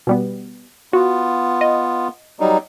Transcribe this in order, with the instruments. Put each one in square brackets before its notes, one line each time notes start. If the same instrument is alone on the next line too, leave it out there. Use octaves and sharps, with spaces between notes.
[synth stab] B2 G3 B3
[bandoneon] B3 F4 [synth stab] F#4
[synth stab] D#5
[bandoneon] F#3 G3 D#4